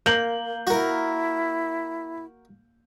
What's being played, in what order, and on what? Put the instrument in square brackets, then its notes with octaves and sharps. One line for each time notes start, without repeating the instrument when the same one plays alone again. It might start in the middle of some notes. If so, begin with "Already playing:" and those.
[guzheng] A#3 [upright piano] G6 F#7
[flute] E4 [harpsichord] F#4 A#4